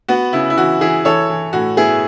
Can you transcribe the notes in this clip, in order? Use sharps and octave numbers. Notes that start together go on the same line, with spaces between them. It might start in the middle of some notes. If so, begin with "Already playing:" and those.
B3 F#4
C#3 E4
E4
E3 F#4
E3 E4 G#4
E3 A4 C#5
E3
A2 F#4
B3 E4 G#4